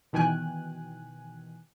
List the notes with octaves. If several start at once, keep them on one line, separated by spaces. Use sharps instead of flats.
B2 D#3 E3 G5 G#5 F#6